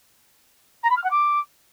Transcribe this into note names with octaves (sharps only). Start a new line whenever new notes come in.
A#5
B5
F6
F#5
D6